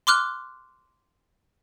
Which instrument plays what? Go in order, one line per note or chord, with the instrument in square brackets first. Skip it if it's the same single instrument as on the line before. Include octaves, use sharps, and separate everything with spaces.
[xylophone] C6 D6 F6 F#6